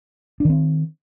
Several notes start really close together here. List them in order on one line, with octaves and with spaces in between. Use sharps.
D4 D#3 C4